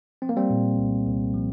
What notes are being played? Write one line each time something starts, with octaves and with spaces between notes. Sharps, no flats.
F3 C4
A#3
G3 C4
A#2
C2
C2
F3